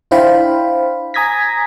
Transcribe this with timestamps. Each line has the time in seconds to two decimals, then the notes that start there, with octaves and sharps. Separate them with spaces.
0.11 D4 E4 C5 F5 G5 B5
1.14 G#5 A#5 D#6 G#6 A#6 B6